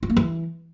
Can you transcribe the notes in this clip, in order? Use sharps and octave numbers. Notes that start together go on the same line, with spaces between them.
F4
A#3
E3